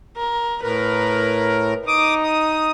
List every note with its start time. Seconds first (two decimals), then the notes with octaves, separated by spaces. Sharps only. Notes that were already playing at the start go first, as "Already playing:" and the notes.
0.17 A#4
0.63 A2 A#4 B4
1.87 D#4 D6 D#6
2.23 D#6